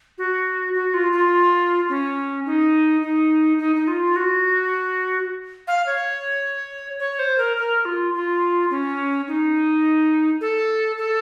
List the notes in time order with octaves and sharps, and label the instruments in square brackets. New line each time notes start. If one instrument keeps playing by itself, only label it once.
[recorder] F#4
F#4
F4
F4
C#4
D#4
D#4
D#4
D#4
F4
F#4
F5
C#5
C#5
C5
A#4
A#4
F4
F4
C#4
D#4
A4
A4